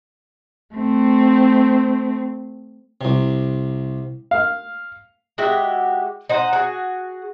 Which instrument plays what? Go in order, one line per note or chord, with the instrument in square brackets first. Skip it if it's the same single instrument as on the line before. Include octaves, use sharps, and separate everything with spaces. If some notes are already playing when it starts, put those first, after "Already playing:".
[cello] A3 C4
[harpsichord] C2 C3
[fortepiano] F5
[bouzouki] G#3 F#4 G4 E5
D#4 C5 F#5
F#4 G#4